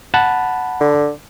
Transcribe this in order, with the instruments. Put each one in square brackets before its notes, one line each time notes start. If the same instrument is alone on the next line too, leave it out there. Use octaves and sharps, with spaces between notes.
[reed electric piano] F#5 A5 B5
[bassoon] D3